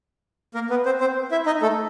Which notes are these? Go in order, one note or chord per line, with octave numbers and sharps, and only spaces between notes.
A#3 A#4
B3 B4
C4 C5
C4 C5
E4 E5
D#4 D#5
A3 A4